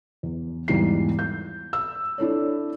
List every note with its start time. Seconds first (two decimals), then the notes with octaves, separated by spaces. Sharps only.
0.23 E2
0.68 E2 G#2 E3 G3 F4 C7
1.19 G6
1.73 E6
2.18 D4 E4 A4 C#5